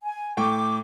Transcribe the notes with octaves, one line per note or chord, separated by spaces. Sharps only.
G#5
A2 G5 C#6 D6